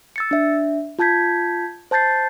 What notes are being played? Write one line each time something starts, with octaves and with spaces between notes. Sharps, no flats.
E6 A6 C#7
D4 E5
F4 A5 G6 G#6 B6
C5 A5 G6 A6 C7